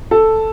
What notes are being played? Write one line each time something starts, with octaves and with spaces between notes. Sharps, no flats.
A4